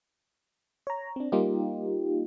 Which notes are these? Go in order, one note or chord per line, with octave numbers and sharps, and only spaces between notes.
C#5 A#5
C4 D4
G3 A#3 D#4 F4 G4